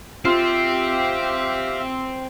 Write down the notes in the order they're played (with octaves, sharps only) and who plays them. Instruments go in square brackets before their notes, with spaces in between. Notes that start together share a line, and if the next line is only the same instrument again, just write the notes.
[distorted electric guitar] C4 [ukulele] F4 [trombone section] G4 [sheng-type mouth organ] E5 F5